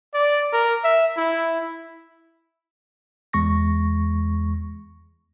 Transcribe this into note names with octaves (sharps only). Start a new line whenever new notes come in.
D5
A#4
E5
E4
E2 G#3 C#6 A#6